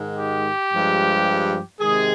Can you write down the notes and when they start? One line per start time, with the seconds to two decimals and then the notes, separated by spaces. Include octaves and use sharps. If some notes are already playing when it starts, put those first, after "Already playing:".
Already playing: G#2 D#3 G#3
0.17 G4
0.72 G2 F3 G#3
1.81 C3 D#3 G#3 G#4